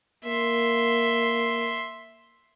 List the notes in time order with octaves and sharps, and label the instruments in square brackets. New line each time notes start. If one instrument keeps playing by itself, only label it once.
[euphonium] A#3 [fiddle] E5 C6